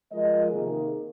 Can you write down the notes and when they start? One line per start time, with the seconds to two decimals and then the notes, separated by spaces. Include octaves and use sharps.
0.11 F3 G#3 F4 A#4 D#5
0.51 C3 D#3 A#3 D#4 G#4